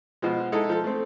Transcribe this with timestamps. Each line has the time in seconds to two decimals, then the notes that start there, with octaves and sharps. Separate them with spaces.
0.22 B2 F3 G#3
0.52 G#3 D#4 E4 A4
0.69 F3 A4
0.84 A3 C4